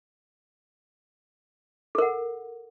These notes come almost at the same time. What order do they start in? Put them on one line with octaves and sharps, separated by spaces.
A4 A#4 F#5